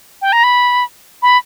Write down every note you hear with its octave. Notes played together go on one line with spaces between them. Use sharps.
G5
A#5
B5
B5